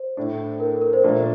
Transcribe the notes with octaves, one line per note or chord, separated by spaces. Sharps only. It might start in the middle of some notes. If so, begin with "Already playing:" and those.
Already playing: C5
A2 A3 D4
A#4
A4
A#4
C5
A#2 F3 A3 D4